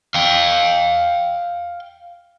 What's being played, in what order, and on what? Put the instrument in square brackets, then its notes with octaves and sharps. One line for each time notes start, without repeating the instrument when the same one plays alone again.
[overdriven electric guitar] F5 G5